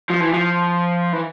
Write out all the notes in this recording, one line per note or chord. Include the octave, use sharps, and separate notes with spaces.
F3
E3
F3
E3